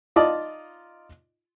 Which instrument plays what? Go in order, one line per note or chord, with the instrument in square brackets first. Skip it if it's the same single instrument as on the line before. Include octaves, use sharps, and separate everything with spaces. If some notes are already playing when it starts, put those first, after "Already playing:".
[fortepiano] D#4 F4 D5 D#5 A5